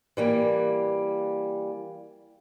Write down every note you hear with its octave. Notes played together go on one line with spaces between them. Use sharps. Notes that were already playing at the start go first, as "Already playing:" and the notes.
E3 G3 A#3